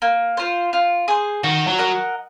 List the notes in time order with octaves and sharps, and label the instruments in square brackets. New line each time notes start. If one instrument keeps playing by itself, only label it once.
[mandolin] A#3
F4 C5
F4
G#4 C5
[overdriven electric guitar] D#3 [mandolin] F#4
[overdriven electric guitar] F#3
[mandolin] A#4 D#5 F#5